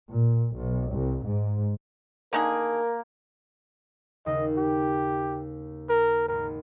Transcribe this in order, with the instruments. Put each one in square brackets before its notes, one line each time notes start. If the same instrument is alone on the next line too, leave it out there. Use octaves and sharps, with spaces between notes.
[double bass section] A#2
B1
C2
G#2
[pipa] D3 D#3 G#4 [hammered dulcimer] A#3 [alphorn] A#4
[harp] D#2 C#3 [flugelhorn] D#5
[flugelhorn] G4
A#4
[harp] G#1 [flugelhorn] A#4